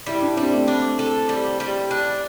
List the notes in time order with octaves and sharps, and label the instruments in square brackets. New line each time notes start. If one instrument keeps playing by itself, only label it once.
[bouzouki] G3 [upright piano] E4
[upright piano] D4
[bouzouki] G3 [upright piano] C4
[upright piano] A3
[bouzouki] D4
A4
G3
G3
D4